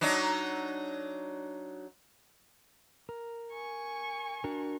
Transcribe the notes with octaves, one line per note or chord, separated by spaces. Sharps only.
F#3 D4 D#4
A#4
G#5 C#6
D4 F#4 A#4